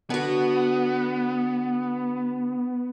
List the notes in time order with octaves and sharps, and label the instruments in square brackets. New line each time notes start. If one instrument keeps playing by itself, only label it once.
[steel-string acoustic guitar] D3 F#4 [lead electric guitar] B3